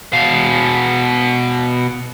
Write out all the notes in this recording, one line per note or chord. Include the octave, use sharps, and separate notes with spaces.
B2 F5